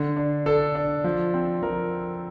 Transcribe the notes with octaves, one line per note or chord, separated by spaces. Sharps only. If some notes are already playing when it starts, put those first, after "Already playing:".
Already playing: D3
D4
D4 A4
D4
F3
C4
F3 A#4